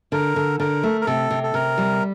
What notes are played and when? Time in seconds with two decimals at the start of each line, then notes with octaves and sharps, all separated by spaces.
0.12 D3 A#4
0.36 D3
0.60 D3 A#4
0.83 A3
1.01 A#4
1.07 C3 A4
1.31 C3
1.43 A4
1.54 C3 A#4
1.78 G3